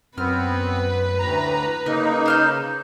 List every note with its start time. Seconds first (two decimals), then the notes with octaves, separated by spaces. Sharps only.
0.17 F#2 B3 C4 B4 F6
1.19 D2 A2 A#5
1.86 C#3 A#3 D#4 A#4
2.26 C5 F6 G6